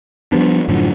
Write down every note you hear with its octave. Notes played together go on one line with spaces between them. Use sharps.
F3 G3 B3 D4
F#2 A2 D3 F3